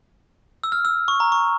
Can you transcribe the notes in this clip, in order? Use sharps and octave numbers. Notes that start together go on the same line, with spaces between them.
E6
F6
E6
C#6
A#5
C#6